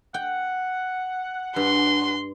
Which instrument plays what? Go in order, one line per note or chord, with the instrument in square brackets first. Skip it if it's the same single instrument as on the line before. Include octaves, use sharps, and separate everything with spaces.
[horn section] F#5 [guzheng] G5
[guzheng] G2 [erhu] C6